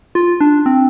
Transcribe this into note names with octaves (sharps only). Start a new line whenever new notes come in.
F4
D4
C4